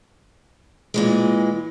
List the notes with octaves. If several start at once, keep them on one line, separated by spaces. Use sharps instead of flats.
A#2 E3 G#3